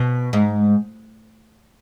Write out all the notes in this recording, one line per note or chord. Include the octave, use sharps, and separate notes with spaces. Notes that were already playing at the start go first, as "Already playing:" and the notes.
Already playing: B2
G#2